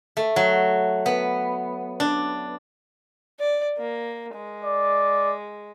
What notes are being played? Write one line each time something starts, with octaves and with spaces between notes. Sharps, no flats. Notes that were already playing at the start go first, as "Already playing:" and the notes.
A3
F#3
B3
D4
D5
A#3
G#3
D5